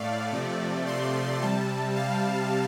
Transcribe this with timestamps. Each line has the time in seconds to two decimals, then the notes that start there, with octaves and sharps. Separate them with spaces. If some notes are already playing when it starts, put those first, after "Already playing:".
Already playing: A2 A3 D5 F5
0.32 C3 F3 A3
0.87 C6
1.42 C3 G3 A5
1.96 F5